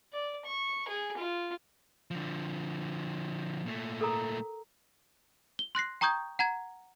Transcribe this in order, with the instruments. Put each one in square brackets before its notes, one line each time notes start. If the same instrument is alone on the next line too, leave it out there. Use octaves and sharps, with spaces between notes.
[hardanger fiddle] D5
C#6
G#4
F4
[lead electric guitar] D3 F3
A#2 A3
[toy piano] A4 A#4 A#5
[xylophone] G7
C6 F#6 A#6 C7
G5 A#5 C#6 D#6 G6 G#6
F#5 A#5 G#6